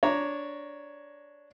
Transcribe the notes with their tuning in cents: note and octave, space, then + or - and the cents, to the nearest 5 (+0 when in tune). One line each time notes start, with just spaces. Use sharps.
D4 -10 C#5 +0 A#5 +0